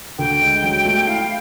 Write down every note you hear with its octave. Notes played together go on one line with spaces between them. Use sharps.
D2 G5
G#3
F#3
A3
E4 F5